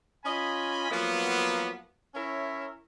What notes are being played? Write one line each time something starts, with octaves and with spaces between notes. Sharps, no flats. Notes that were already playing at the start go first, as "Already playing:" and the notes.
C#4 F4 D#5 G#5 B5
F3 F#3 A#3 B3
C#4 E4 A#4 C#5 E5